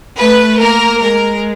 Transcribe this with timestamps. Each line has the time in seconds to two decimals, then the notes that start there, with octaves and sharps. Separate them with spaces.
0.19 A3 B4
0.60 A#3 A#4
1.02 G#3 A#4